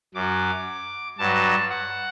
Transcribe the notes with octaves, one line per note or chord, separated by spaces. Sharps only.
F#2 F#3 D6
G2 F#3 A5
F#5